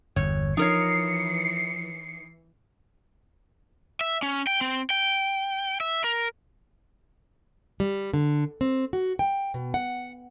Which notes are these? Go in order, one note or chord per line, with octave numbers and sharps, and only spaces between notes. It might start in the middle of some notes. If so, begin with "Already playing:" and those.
G1 E2 C#5
E3 F3 D#4 A#4 C#5 C7 C#7
E5
C#4
G5
C4
G5
E5
A#4
G3
D3
C4
F#4
G5
B2
F#5